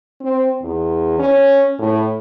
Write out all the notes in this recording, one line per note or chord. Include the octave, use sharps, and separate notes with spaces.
C4
E2
C#4
A2